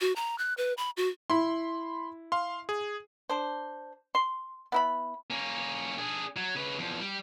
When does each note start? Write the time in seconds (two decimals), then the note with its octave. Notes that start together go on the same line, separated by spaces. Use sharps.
0.01 F#4
0.16 A#5
0.38 F#6
0.57 B4
0.77 B5
0.97 F#4
1.30 E4 B5 C6
2.32 F5 C6
2.69 G#4
3.30 D4 C5
4.15 C6
4.72 B3 E4 B5
5.30 A#3 C#4
5.98 D4 G#4
6.36 F#3
6.55 C#3 B4
6.79 E2 F3
7.00 G3